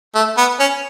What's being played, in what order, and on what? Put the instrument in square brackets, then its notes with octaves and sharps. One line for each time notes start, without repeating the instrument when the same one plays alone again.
[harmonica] A3
B3
C#4